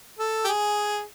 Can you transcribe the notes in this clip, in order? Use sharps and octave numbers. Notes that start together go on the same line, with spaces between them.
A4
G4
G#4